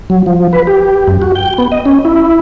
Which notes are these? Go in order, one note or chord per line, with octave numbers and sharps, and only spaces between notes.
F#3
F3
B4
G4
F#2
F#4
G5
B3
D#5
C#4
E4